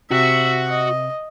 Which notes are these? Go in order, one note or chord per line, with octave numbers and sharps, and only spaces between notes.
C3 F#4 E5
D#5